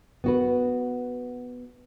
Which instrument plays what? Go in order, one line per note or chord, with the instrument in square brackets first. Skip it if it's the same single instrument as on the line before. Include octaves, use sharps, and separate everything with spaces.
[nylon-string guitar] B3 F#4 B4